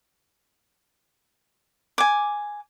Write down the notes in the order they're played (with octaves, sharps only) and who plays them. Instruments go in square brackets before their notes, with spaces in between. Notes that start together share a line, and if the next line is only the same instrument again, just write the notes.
[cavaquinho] G#5 D6